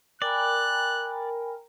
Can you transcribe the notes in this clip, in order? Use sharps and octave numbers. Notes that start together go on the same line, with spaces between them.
A#4 D5 G5 G#5 B5 F#6